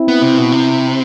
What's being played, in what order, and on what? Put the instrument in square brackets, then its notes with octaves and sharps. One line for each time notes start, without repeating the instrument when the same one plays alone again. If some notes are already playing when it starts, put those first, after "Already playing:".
Already playing: [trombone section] C4 E4
[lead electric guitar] B3
C3
B2
C3